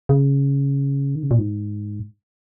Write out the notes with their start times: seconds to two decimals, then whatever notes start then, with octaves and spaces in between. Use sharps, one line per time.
0.09 C#3
1.15 D#3
1.23 C#3
1.31 A#2
1.39 G#2